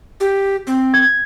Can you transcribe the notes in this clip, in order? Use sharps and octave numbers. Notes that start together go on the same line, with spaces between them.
G4
C4
G#6